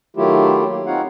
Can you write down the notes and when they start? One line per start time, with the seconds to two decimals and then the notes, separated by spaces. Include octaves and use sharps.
0.17 D#3 F#3 A3 E4 F4 G4
0.68 A#3
0.86 C4 D#4 F4 C#5 F5 F#5